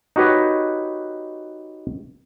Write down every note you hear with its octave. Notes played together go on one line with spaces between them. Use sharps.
D#4 F#4 G4 B4 C#5 D#5